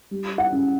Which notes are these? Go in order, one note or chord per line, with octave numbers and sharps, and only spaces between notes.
G3
F#5
C#3